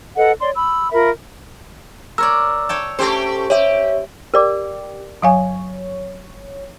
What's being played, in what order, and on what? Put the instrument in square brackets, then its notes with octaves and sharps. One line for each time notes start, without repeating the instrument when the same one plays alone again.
[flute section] A4 B4 D#5 F#5
C#5 D5 C6
B5 E6
F4 A#4 E5 B5
[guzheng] A#4 C#5 D5 [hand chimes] E6
[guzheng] C#5 G5 A5
[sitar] A3 G4 C5 [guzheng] C#4
[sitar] G4 [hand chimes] C#5 E5
[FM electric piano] G4 [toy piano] A#4 D5 D6
[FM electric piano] G1 C#5 [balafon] F#3 F5 G#5